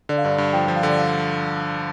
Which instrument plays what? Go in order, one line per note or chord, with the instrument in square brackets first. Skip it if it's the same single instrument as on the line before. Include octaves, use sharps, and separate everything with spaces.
[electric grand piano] D3 [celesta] D5
[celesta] F5
[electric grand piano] G2 [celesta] D5
[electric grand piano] G2
[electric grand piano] F3 [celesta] G5
[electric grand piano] F3
[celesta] F5
[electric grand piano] D3
[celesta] D5
F5